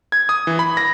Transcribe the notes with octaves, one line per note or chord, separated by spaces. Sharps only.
G#6
D#6
E3
B5
A#6